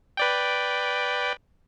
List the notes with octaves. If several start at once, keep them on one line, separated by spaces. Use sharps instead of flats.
B4 D5 G5